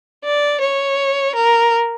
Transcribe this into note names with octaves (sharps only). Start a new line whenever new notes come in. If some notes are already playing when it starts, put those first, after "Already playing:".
D5
C#5
A#4